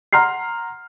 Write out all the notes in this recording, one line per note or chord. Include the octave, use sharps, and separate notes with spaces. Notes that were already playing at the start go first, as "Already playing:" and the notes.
F#5 A#5 C6 F6 C7